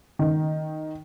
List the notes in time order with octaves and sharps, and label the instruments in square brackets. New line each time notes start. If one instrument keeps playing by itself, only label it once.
[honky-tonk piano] D#3